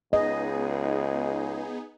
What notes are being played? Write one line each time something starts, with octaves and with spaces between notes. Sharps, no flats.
C#2 B3 D#4 G#4 D#5